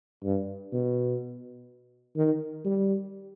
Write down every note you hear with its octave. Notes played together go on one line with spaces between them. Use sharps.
G2
B2
D#3
G3